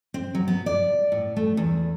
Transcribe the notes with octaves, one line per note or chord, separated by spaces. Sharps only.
C4
F#3
B3
D5
A2
A3
E2